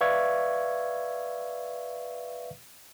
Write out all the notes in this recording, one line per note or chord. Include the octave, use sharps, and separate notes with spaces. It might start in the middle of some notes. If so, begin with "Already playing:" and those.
B4 D5 E5 F5 C#6 G#6